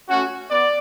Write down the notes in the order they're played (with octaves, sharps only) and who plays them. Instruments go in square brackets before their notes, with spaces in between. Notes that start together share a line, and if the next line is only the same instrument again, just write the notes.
[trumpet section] A3 C#4 F#4
B3 D5